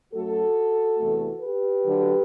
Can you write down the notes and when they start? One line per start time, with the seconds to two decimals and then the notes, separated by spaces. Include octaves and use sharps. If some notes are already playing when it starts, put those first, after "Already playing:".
0.13 F#2 F#3 A3 F#4 A4
0.98 E2 C3 E3 A3
1.40 G4 B4
1.83 D2 D3 F#3